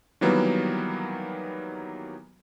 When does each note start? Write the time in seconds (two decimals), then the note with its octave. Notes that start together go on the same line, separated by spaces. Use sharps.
0.21 D#3 E3 F#3 G3 A#3 B3